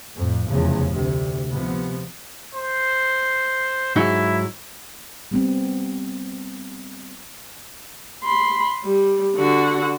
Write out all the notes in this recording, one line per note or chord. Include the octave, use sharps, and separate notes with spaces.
F2 A2
F1 E2 C#3 F3
D2 C3
C3 F3 B3
C5
G#2 F#3 D#4 E4
G3 B3 C4
B5 C6
G3
D3 F#4